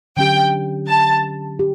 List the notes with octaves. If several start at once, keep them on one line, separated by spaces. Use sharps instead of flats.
D3 F#3 C#4 G4 G5
A5
G4